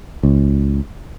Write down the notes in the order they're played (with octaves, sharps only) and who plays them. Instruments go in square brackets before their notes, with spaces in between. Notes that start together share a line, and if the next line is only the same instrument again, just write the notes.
[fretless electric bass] C#2